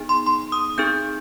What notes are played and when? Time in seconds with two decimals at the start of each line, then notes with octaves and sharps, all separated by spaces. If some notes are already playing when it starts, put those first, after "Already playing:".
Already playing: B3 D#4 G#4
0.09 C6
0.27 C6
0.52 D#6
0.78 C4 D#4 G#4 G6